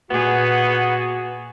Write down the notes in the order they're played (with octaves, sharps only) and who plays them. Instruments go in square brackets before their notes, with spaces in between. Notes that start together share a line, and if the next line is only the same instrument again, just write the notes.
[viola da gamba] A#2 G#4 [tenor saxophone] B3 [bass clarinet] F#4